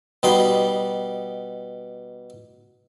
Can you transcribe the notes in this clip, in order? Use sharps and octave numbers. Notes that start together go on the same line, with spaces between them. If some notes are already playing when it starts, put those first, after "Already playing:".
B2 G3 D#4 B5 C6